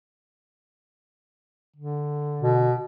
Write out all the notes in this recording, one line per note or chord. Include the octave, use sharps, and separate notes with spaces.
D3
B2